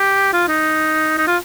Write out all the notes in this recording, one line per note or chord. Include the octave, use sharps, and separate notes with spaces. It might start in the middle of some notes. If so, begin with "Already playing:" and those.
Already playing: G4
F4
D#4
D#4
F4